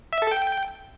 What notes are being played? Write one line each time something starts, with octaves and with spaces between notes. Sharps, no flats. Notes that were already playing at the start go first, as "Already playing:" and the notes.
E5
A4
G5